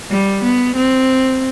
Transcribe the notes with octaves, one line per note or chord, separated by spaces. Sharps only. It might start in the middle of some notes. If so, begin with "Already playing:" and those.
G3
B3
C4